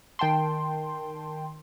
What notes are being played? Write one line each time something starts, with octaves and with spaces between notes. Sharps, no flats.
D#3 G5 A5 C6